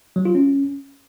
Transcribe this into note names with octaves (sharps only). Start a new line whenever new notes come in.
F#3
F4
C#4